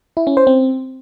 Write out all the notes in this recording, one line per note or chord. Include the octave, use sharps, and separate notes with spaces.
E4
C#4
C5
C4